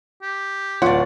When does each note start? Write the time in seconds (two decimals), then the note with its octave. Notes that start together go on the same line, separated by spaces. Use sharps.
0.22 G4
0.82 D1 F4 C#5 D5 F#5